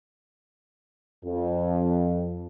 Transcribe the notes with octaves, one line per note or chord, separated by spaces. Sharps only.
F2